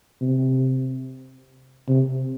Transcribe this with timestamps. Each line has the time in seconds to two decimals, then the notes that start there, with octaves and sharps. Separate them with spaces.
0.21 C3
1.88 C3